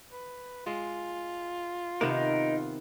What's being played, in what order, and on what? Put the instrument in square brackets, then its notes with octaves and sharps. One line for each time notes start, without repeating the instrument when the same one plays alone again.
[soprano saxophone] B4
[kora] G#3 [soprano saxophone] F4
[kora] C3 D#3 B3 [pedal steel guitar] D#4 A#4